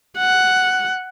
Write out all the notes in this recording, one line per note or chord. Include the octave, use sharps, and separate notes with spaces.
F#5